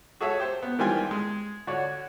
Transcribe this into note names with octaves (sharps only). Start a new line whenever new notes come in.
F#4 G#4 A4 C#5 E5
G4 C5
B3
D#3 E3 G3 C4 F4 G#5
G#3
D3 F#4 C#5 D5